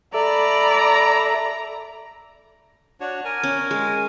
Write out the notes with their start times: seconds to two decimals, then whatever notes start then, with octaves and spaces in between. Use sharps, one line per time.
0.14 A4 D5 E5 A#5 B5
3.00 D4 F#4 C#5
3.25 A#4 G#5
3.44 C#4
3.71 G#3